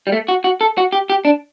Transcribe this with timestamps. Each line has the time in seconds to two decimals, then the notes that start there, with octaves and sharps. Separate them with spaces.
0.07 G3
0.12 A3
0.28 F#4
0.44 F#4
0.61 A4
0.78 F#4
0.93 G4
1.10 G4
1.25 D4